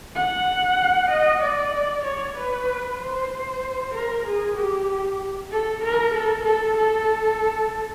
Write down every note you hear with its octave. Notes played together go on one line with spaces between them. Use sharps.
F#5
D#5
D5
C#5
B4
C5
A#4
G#4
G4
A4
A#4
A4
A4
A4